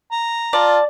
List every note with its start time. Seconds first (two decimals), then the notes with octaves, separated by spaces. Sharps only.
0.12 A#5
0.53 F4 D5 A5